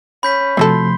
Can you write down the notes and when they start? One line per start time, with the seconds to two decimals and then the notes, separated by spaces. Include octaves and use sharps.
0.23 C#4 B5 G6 B6
0.57 C3 F3 A3 C4 F#4 A4 C6